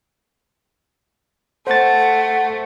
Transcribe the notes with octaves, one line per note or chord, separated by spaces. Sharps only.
A3 C5 F#5 A6